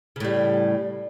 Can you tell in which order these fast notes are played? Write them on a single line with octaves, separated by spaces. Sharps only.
C#3 A2 G3